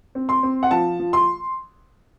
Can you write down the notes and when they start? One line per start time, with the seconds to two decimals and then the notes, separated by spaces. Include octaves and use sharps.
0.15 C4
0.29 C6
0.43 C4
0.63 F#5
0.71 F3 A5
0.99 F3
1.13 C6